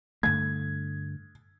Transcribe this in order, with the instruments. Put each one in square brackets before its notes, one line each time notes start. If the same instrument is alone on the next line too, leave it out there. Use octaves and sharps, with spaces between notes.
[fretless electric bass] G2 D3 A3 [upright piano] G#6